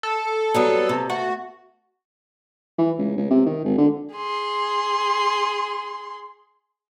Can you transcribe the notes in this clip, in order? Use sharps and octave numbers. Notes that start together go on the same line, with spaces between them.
A4
F#3 G3 B3
C3
A3 F#4
E3
C#2
C#2
C3
D#3
G#1
D3
G#4 C6